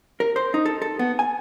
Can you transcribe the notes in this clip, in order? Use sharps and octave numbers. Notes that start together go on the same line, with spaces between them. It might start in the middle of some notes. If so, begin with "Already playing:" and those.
A#4
C5
D#4
A4
A4
B3
G#5